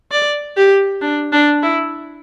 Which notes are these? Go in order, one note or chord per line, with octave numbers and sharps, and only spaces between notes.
D5
G4
D4
D4
E4